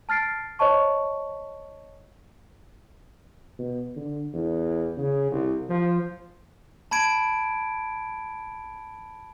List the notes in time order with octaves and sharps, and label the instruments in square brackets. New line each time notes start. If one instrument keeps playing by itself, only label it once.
[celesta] A5 F6 A6 C7 D7
C5 C#5 D#5 A5 C#6
[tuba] B2
D3
E2
C#3
C2
F3
[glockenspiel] A5 B5 G#6 D7